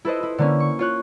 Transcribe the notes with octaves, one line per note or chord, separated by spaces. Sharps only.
E4 A4 B4 C5 D#5
E4
D3 A#3 C#4
C#6
F4 C#5 F#6